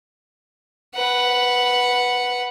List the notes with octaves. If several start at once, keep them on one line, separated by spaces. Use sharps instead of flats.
B4 F#5